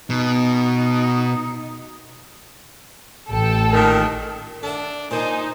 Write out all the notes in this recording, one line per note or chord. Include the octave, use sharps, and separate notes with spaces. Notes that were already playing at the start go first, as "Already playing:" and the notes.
B2 D#4
A1 A4 G5
A#2 D#3 A#4
D4 A4 E5 F#5
A#2 D#4 C5 G#5